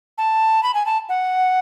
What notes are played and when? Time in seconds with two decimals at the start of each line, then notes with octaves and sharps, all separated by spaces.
0.18 A5
0.63 B5
0.74 G#5
0.86 A5
1.09 F#5